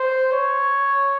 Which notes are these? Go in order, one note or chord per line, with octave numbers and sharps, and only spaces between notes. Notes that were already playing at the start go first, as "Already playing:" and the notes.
Already playing: C5
C#5